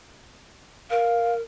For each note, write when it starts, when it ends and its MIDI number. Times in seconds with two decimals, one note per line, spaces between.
0.90 1.41 70
0.90 1.34 77